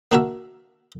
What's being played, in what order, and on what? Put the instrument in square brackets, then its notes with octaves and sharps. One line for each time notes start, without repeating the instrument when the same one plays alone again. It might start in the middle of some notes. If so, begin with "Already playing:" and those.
[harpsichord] A#3 D4 F#4 A#4 E5